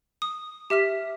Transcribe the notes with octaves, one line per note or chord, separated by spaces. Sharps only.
D#6
G4 E5 F6 B6